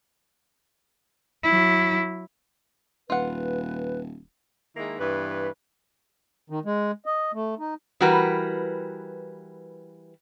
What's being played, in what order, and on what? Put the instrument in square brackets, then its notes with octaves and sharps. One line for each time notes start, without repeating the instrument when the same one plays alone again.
[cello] F#3 E4
[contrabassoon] D#1 [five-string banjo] F4 F#5 [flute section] B4
[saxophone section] D#3 G#3 A#3 E4
G2 E3 B3 B4
[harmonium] D#3
G#3
D#5
A3
D#4
[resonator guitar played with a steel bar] E3 G3 F#4 A#4 B4